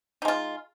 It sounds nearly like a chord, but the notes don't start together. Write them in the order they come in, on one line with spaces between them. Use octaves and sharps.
D#4 G#3 F4